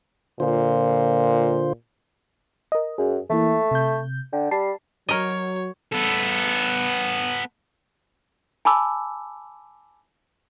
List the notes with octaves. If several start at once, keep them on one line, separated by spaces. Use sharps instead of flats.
A#2 D3 F4 C5
A#4 D#5
F#2 G#4
E3 A3 A#3 E4
C3 G6
D3 G5
G3 A5 C7
F#3 A#4 C#5 D#5
B3 A4
G#5 A5 B5 D6 E6